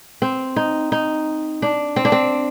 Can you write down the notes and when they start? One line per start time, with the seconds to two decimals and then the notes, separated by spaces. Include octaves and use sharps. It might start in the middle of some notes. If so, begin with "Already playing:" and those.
0.22 C4
0.56 D#4
0.92 D#4
1.62 D4
1.96 C4
2.05 D4
2.12 C4